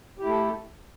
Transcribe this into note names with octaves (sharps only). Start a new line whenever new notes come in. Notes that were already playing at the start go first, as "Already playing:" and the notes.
A3 E4 G4 A4